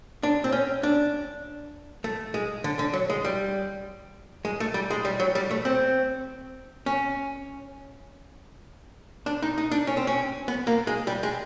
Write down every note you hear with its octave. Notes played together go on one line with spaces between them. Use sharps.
D4
C4
C#4
D4
A3
G#3
D3
D3
F#3
G#3
G3
G#3
A3
G3
G#3
G3
F#3
G3
A3
C4
C#4
D4
D#4
D#4
D4
C#4
C4
C#4
B3
A#3
G#3
G3
G#3